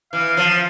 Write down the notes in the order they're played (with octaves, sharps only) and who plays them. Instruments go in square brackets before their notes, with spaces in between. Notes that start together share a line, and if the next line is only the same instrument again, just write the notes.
[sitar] E3 [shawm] F5
[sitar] F3